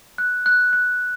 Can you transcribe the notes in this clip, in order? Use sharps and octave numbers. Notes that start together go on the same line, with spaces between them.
F#6
F#6
F#6